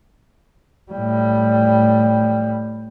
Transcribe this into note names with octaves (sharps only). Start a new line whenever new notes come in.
A2 G3